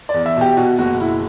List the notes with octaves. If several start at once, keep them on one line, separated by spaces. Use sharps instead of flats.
D5
E2
E5
B2 G4
B2 F#4
F#1 F#4
F#1 E4